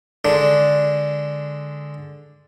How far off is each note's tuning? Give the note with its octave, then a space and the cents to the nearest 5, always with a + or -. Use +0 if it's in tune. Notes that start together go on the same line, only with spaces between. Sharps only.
D3 +0 G#3 +0 D4 +0